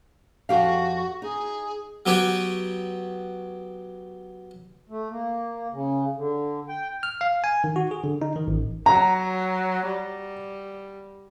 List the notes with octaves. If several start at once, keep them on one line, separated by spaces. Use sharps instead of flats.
F2 F#4 G4 F5
D#4 G#4
F#3 B3 G4 B4 C#5
A3
A#3
C#3
D3
G5
F6
F5
G#5
D#3
F#4
G#4
D3
D#4
D#3
A1
F#3 A#5
G3